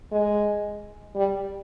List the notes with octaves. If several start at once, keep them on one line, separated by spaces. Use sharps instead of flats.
G#3
G3